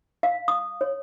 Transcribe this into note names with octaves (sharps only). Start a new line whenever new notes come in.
F5
D#6
C#5